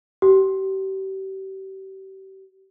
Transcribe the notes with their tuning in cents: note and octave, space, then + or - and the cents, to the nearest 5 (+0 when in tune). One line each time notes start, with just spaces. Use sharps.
G4 -35